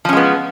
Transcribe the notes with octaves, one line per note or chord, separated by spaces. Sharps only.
F3 G#3 B3 C#4